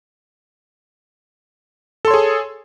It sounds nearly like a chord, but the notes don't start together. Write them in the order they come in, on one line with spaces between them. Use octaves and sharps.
A4 C6 C#5 G#4